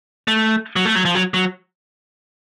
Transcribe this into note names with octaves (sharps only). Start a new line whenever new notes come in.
A3
F#3
A3
F#3
F3
F#3
F#3